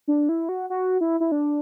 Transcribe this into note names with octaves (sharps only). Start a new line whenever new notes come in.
D4
E4
F#4
F#4
E4
E4
D4